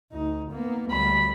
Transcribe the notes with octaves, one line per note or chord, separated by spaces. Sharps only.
D2 D#4
A#3 B3
D2 G3 B5